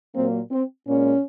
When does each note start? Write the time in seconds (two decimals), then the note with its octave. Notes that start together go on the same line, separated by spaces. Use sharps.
0.15 A#2 F#3 A#3 C4
0.52 C4
0.88 A#2 G#3 C#4